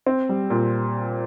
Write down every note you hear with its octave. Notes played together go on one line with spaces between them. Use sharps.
C4
G3
A#2